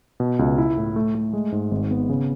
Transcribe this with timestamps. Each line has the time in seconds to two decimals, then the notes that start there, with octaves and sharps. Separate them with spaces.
0.20 B2
0.39 C#2
0.58 E4
0.77 A2
0.96 A3
1.15 A3
1.33 G#3
1.52 G#2
1.71 G#1
1.91 B3
2.09 C#3